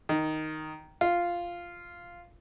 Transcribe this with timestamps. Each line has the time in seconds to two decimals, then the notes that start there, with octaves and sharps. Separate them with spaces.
0.09 D#3
1.01 F4